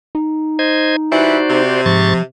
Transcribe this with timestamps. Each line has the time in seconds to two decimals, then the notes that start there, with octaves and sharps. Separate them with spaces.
0.15 D#4
0.59 C5 D#5 G#6
1.12 E3 G3 E4 F#4 C5 D5
1.50 C3
1.86 G#2 F3 C#6 A6